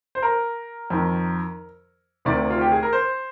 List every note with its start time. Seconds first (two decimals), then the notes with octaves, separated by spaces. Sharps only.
0.15 C5
0.22 A#4
0.90 F2 D#3
2.25 D2 C3 D#3 D5
2.50 F4
2.61 G4
2.72 G#4
2.83 A#4
2.93 C5